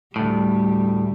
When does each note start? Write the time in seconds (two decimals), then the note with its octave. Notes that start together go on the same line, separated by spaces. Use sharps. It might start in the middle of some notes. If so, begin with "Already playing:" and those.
0.16 D2 A2 G3